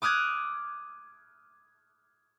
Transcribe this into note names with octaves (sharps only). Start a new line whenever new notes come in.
D6 D#6 F6 F#6 G#6